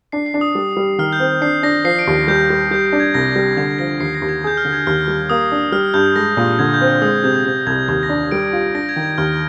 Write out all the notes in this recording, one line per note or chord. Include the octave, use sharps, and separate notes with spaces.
D4 C7
C7
D4
D#6
G3
G3
D#3 F6
G6
C4
D4 C7
D4 A#6
F3 C7
D7
D#2
C7
G3 G6
G3 G6
G3 G6
G6
D4
G#6
C2 A#6
G3 A#6
D3 G#6
F3 A#6
D#2 C7
A#6
D#2
G#6
G#4 G6
F6
D3
G#6
D#2 F6
G3
A#3 D#6
D4
G3 F6
G2 G6
G#3 A#6
A#2
D3 G#6
G6
C4
F6
G#3 D#6
C3 G6
G#6
C3 G6
C2 G#6
D#2 G#6
A#6
D4
G3 D7
F4
D4 A#6
G#6
D#3
G#6
D#2 F6